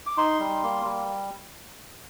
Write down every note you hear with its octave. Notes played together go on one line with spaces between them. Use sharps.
D6
D#4 C6
G3
A#3
G3